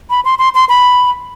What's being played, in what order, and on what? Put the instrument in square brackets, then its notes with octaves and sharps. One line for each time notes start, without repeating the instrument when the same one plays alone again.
[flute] B5
C6
C6
C6
B5